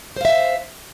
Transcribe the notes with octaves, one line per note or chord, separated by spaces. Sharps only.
C5 E5 F5